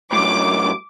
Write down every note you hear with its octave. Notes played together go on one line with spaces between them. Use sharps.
F#2 A2 D6